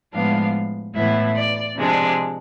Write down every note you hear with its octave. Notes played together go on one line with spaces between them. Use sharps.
A2 F3 G#3 B3 D4 F5
A2 E3 B3 E4 E5
D5
C3 F3 G#3 D4